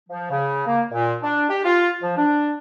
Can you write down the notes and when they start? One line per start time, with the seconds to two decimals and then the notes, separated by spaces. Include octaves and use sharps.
0.09 F3
0.30 C#3
0.67 A#3
0.91 A#2
1.22 D4
1.50 G4
1.64 F4
2.02 F3
2.17 D4